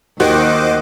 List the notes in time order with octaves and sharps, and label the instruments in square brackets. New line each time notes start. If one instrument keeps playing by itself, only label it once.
[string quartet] D#2 [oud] D#3 [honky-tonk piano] F#4 [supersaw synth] C5 D#5 D6